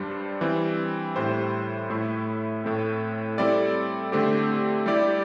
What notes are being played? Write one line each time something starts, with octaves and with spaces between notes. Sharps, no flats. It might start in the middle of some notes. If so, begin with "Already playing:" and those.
Already playing: G2 G3 D4 C5
E3 G3 C4
A2 G3 E4 C5
A2 A3 E4
A2 A3 C4
G3 C4 E4 A4 D5
D3 A3 C4 G4
G3 E4 G4 D5